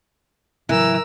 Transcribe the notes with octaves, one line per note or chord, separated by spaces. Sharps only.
A2 C#3 E3 F#3 A#4 E6